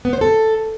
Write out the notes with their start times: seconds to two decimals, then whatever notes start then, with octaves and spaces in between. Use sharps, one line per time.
0.05 B3
0.13 C5
0.21 A4